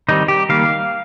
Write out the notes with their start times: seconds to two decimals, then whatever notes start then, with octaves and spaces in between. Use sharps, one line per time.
0.08 D#3 G3 C4 D#4
0.28 G4
0.49 D#3 G3 A#3 F5